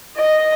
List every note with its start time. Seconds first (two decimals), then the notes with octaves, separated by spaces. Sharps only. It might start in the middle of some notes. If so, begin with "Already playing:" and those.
0.16 D#5